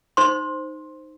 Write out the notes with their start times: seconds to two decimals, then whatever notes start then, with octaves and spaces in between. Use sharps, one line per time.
0.17 D#4 C5 C6